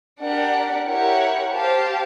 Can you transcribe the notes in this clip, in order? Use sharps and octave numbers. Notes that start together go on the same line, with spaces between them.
D4 G4 A#4 D5 F#5
E4 G4 A#4 C#5 F#5
G4 C5 F5 A5